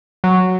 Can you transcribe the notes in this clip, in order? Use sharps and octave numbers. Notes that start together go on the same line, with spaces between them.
F#3